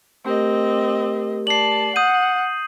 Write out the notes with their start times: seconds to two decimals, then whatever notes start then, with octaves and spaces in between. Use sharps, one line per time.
0.25 A3 C4 G4 A#4 D#5
1.47 D5 A5 C7 F#7
1.96 F#5 D#6 G6 D#7